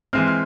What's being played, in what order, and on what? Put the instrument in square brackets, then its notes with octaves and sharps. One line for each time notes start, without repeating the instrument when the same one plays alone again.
[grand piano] E3 G#3 C4 F6
F6